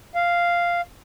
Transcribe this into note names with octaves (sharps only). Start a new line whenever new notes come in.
F5